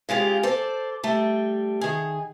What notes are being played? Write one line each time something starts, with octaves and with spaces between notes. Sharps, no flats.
C#3 G#3 F4 G4
A4 C5 D5
G3 A3
D#3 G#4